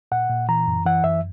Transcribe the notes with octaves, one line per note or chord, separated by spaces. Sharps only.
A#2 F#5
A#2
E3 A#5
F#2
E3 F#5
F#2 E5